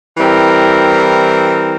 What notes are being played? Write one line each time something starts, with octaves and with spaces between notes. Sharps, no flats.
E3 G3 C4 E4 A#4